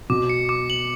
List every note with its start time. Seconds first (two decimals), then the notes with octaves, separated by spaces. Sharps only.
0.10 B2 D6
0.29 C#7
0.49 D6
0.70 F#7